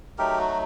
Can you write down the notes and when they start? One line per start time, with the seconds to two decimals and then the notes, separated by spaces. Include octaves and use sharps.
0.18 F#3 A3 D#4 G4 A#4
0.38 F#4